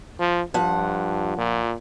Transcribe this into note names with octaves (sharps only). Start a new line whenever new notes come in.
F3
G2 F3 F#5
A#2